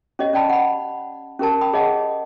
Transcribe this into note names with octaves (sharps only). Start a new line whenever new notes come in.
C#4 G4 C#5 D#5
C#4 D5 G5 A5 B5
F#5 B5
C#4 G4 A#4 A5
G5 B5 D#6
G#4 C#5 D#5 F#5 A5